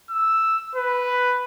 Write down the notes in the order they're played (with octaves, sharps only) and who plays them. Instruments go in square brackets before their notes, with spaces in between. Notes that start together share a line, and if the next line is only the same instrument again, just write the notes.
[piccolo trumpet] E6
B4